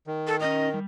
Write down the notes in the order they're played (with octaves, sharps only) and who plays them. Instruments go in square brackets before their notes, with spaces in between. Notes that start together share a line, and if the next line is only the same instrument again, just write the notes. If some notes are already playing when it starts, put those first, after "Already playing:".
[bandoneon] D#3
[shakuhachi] A4
[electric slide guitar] C#4 D#4 A#4 [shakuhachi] D#5
[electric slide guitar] G3